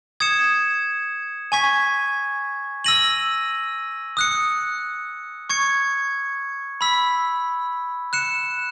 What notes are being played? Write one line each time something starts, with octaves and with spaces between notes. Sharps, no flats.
D#6 G#6 C#7 E7
G#5 C#6 G#6 B6
E6 A#6 D#7 F#7
D#6 F#6 C#7
C#6 G#6 C#7
B5 E6 B6
F#6 C#7 E7